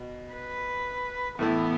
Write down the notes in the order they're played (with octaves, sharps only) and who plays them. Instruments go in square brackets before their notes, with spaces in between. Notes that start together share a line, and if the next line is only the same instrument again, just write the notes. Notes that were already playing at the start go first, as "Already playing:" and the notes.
Already playing: [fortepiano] B2
[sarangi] B4
[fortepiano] A2 E3 A3 E4 [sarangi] B3